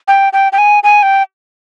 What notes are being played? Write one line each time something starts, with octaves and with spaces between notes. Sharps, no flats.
G5
G5
G5
G#5
G#5
G5